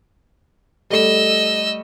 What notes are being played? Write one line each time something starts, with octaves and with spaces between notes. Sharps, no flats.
G3 A3 D#5 E6